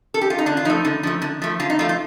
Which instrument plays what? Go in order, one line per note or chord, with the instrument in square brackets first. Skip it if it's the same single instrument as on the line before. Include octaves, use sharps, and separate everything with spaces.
[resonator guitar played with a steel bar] A4
G4
F4
D#4
D3 D4
F4
F3 A3 D#4
D3
F3 A3
D3
F3 A3
D3 F4
D#4
F3 A3 F4
F4